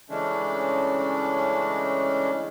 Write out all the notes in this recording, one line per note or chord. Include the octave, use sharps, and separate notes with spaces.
C#3 E3 G#3 A3 C#4 D4